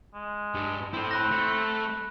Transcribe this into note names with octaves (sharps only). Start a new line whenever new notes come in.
G#3
G2
C4 E4 A4
B5 F#6 A#6
A3